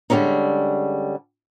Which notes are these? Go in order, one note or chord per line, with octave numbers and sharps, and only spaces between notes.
D3 G3 G#3 C#4 D#4